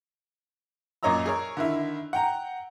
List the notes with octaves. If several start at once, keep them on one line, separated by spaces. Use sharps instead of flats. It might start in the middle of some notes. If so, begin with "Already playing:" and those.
F#2 A#2 C#5 D#5 A#5 E6
G#4 A#4 C#5
D3 D#3 E4
F#5 G5 A#5